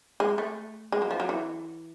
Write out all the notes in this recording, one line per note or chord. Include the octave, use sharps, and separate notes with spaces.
G#3
A3
G#3
F#3
F3
F#3
E3